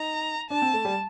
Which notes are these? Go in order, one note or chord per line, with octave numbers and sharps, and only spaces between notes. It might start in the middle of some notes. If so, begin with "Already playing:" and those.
Already playing: D#4 A#5
D4 A5
C4
A3
G3